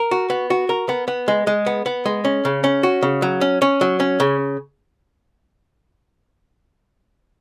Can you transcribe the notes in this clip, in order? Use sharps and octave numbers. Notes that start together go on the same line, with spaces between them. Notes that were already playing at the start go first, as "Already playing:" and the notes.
Already playing: A#4
F#4
B3
F#4
A#4
B3
B3
G#3
G#3
B3
B3
G#3
C#4
C#3
C#4
F#4
C#3
F#3
C#4
C#4
F#3
C#4
C#3